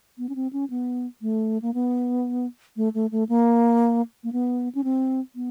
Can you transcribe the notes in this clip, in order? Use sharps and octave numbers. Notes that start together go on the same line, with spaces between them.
B3
C#4
C4
C#4
B3
A3
A#3
B3
A3
A3
A3
A#3
A#3
B3
C#4
C4
B3